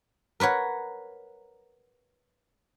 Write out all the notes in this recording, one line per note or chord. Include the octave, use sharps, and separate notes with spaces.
A#4 B4 C#5 F#5